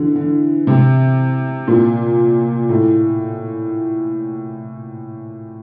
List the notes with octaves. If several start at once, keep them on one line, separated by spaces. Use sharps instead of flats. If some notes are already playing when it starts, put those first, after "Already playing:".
Already playing: D3 E3
D3
C3
A#2
A2